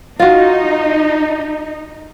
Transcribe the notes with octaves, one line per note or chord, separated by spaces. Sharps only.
D#4 F4 F#4